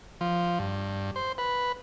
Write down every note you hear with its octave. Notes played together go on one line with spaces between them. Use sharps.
F3
G2
C5
B4